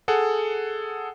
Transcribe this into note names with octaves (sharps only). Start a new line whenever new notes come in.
G#4 A4 F#5